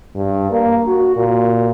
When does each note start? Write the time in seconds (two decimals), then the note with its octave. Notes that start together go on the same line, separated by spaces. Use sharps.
0.15 G2
0.51 A#3
0.87 F#4
1.16 A#2